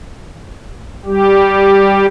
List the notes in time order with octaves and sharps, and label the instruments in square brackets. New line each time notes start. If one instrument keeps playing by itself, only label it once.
[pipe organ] G3 G4